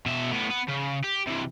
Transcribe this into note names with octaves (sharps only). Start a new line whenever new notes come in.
B2 E5
A2 B3
B3
C#3
G4
C3 E3